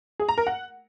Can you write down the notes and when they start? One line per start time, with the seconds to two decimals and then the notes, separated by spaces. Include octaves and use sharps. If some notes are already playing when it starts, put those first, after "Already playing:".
0.20 G#4
0.29 A#5
0.38 A#4
0.47 F#5